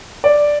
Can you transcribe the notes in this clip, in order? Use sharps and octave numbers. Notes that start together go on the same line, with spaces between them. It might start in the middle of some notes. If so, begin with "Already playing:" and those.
D5